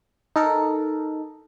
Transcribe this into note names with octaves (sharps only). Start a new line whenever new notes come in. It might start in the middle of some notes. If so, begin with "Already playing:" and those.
D#4 A4 A#4